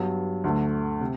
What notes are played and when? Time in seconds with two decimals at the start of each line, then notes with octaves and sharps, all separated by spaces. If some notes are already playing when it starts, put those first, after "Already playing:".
Already playing: G2 F#3 B3
0.44 D2 D3 A3
1.01 C3